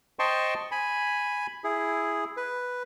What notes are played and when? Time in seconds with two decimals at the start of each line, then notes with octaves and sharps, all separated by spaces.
0.19 C5 D#5 G5 A5 C6 C#6
0.72 G#5 B5
1.64 E4 G#4
2.37 B4